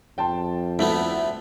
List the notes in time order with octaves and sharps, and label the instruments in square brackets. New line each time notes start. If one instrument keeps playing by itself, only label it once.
[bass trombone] F2 [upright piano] G5 A5 C6
[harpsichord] D2 A3 B3 [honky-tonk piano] E4